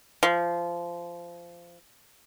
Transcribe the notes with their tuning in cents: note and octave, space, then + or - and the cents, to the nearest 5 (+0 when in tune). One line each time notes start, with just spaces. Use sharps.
F3 -20